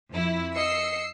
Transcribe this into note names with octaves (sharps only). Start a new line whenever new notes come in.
F2 E4
D#5 E6 C7 C#7